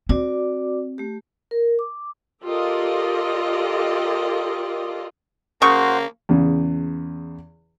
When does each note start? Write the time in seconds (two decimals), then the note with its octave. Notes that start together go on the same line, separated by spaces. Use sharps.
0.09 C4 F#4 D5 D6
0.98 A3 G4
1.51 A#4
1.79 D6
2.43 F4 G4 A4 A#4 D5 D#5
5.62 C#3 A#3 F#4 C5 C#6
6.29 E2 C#3